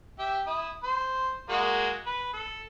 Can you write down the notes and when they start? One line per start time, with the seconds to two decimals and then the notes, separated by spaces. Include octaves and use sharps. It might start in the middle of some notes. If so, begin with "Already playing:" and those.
0.19 G4 E5
0.47 E4 D#6
0.83 C5
1.49 G#3 A#3 F#4
2.06 B4
2.33 A4